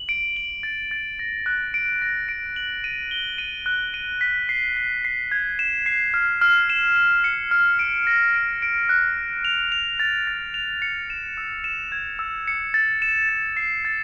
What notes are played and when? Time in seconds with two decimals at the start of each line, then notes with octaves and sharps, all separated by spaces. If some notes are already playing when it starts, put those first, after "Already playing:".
Already playing: F#7
0.09 D7
0.37 F#7
0.63 A6
0.91 A6
1.19 A#6
1.46 F#6
1.74 D7
2.02 A#6
2.29 D7
2.56 F#7
2.84 D#7
3.11 G7
3.38 D#7
3.66 F#6
3.94 D#7
4.21 B6
4.49 C7
4.77 C7
5.05 C7
5.32 G#6
5.59 E7
5.86 C7
6.14 F6
6.41 F6
6.70 E7
6.96 E7
7.24 C#7
7.51 F6
7.79 D7
8.07 A#6
8.34 D7
8.62 D7
8.89 F#6
9.17 F#6
9.45 F7
9.72 F7
10.00 A6
10.27 A6
10.54 F7
10.82 C#7
11.10 E7
11.37 E6
11.64 E7
11.92 G#6
12.19 E6
12.48 C#7
12.74 A6
13.02 E7
13.29 A6
13.57 C7
13.85 A6